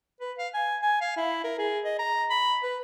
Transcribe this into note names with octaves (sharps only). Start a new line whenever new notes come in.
B4
F5
G#5
G#5
F5
E4
A#4
G#4
D#5
A#5
B5
B4